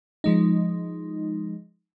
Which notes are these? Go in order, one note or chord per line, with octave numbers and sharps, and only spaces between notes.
F3 G#3 D#4